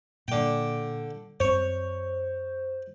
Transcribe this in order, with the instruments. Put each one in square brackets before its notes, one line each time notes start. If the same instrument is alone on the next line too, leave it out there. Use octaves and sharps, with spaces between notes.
[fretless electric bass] A#2 [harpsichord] D3 G5
[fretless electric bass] F#2 C4 [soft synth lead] C5 [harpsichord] C#5